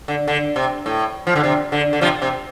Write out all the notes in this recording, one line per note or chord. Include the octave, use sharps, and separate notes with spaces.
D3
D3
C3
A2
F3
D3
C3
D3
D3
C3 F3
C3